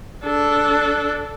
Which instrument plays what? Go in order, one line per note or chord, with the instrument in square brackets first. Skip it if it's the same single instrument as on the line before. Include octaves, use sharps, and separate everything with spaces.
[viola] D4 A4